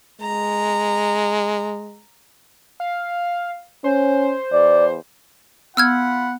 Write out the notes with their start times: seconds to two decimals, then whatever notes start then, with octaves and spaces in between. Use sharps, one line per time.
0.20 G#3 A#5
2.80 F5
3.84 C#4 C5
4.53 E2 D5
5.77 B3 F4 F#5 B5 E6 F6 G#6